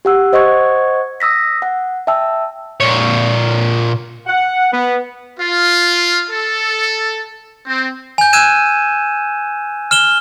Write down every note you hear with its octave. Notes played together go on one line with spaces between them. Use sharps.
G4 F#5 E6
C5 D#5 F#5 C#6 G#6
D#6 E6 A#6 B6
F#5
E5 G5 A5 E6
A#2 C#5
F#5
B3
F4
A4
C4
G#5 G6
E6 F#6 G#6 D#7 E7
F6 E7 G7